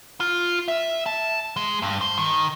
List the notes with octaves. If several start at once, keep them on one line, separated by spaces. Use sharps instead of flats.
F4
E5
A5
G#3
G2
C5
D#3